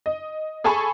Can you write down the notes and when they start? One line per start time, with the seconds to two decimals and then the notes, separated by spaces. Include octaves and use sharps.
0.06 D#5
0.64 G#4 A4 G#5 A5 B5 C#6